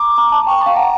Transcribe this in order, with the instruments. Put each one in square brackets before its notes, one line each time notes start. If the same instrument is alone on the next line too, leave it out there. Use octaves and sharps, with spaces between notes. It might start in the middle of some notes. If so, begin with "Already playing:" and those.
Already playing: [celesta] A#5 [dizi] D6
[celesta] A#5
A5
[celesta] G5 [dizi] C#6
[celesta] F5 [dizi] A5
[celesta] F#5 [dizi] A#5